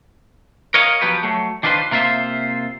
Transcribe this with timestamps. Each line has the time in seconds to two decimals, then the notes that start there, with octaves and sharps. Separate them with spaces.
0.74 A#4 C#5 D#5 F5
1.01 F3 F#3 B3 G4 B4
1.23 F#3 A3
1.63 D#3 D4 F4 B4 C5
1.91 C3 A#3 F4 C5 E5